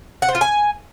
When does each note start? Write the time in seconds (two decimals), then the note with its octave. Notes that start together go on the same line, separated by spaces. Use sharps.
0.22 F#5
0.28 C5
0.35 F4
0.41 G#5